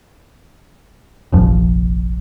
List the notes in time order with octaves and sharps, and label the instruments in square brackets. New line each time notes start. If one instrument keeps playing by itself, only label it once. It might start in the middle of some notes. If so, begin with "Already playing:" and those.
[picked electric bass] F1 A#1 F3